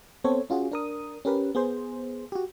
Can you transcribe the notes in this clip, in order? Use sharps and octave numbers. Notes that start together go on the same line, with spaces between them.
B3 C4 A4 C5 C#5
C#4 F4 F#4 G#4
D4 A#4 D#6
C#4 G4 A#4 B4
B3 G#4 C5
F#4 G4